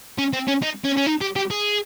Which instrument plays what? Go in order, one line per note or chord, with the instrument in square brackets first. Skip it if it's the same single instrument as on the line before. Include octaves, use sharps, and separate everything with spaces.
[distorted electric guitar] C#4
C4
C#4
D#4
C#4
C#4
D#4
G4
G4
G#4